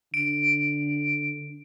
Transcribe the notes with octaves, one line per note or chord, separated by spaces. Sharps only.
D3 D7